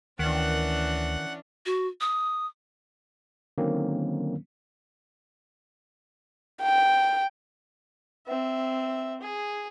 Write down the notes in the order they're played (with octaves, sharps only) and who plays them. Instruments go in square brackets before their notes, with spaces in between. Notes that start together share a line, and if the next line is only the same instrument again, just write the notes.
[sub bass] D2 [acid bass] D#3 [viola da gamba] E3 C#4 D4 [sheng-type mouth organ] F#5 F#6
[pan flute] F#4
D#6
[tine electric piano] D3 D#3 F#3 A#3 C4 C#4
[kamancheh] G5
C4 E5
G#4